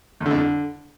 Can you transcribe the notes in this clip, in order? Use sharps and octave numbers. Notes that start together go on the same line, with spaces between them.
E2
D3
F2
D3